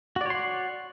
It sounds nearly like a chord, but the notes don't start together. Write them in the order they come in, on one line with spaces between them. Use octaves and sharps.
F#4 D5 C#5 C6 F#5